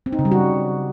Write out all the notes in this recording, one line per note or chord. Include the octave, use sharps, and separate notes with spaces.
C4
D#4
C#3
G3
F#4